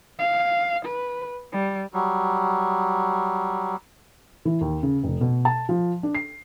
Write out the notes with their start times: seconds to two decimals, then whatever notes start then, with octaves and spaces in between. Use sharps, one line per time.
0.19 F5
0.85 B4
1.53 G3
1.94 F#3 G3
4.45 E3
4.61 D#2
4.83 C#3
5.03 F1
5.21 B2
5.45 A5
5.69 F3
6.03 D4
6.15 C7